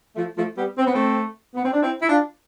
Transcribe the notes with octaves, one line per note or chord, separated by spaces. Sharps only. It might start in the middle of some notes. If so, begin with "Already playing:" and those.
F3 A3
F3 A3
G3 B3
C4
B3
A3 C4
B3
C4
D4
C4 E4
E4
D4 F4